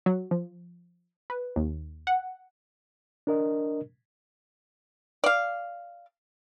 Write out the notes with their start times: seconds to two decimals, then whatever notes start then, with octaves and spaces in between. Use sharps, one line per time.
0.06 F#3
0.31 F3
1.30 B4
1.56 D#2
2.07 F#5
3.27 D4 A#4 D#5
5.24 D5 F5